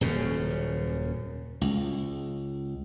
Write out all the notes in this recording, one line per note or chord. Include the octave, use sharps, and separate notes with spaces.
D#1 F#2 C#3
C#2